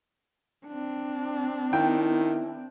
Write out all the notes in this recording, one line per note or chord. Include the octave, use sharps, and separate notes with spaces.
C4 D4
D#3 E4 G5